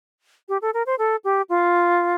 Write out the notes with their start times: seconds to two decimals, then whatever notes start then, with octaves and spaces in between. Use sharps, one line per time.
0.49 G4
0.62 A4
0.74 A#4
0.86 C5
0.99 A4
1.24 G4
1.49 F4